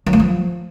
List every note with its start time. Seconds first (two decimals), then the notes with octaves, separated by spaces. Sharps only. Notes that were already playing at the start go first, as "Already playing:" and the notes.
0.06 F#3
0.13 A3
0.20 F3